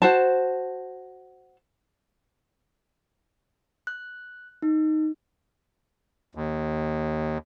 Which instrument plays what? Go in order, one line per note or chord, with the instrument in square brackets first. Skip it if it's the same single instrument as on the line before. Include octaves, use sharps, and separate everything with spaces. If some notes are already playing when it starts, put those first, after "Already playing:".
[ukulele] F#4 C5 A5
[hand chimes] F#6
D#4
[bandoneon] D#2